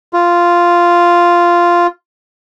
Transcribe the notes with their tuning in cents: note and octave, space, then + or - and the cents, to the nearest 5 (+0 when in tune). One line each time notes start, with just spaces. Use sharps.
F4 -5